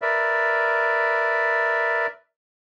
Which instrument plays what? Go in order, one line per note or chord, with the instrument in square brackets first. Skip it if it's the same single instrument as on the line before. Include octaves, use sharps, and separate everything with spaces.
[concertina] A#4 B4 D5 E5